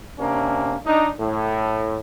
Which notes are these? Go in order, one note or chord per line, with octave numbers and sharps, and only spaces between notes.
C3 A#3 C#4 D4
D4 D#4
A2